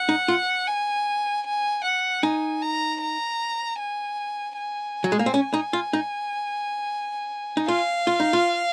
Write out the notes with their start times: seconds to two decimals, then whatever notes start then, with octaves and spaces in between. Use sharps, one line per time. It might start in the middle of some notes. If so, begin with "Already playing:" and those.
Already playing: F#5
0.09 D#4
0.28 F4
0.67 G#5
1.46 G#5
1.84 F#5
2.23 D#4 G#5
2.62 A#5
3.01 A#5
3.79 G#5
4.57 G#5
5.04 F#3
5.12 G#3
5.19 A#3
5.26 C4
5.34 C#4
5.54 D#4
5.73 F4
5.93 D#4
7.57 D#4
7.68 F4 F5
8.07 F4
8.20 D#4
8.33 F4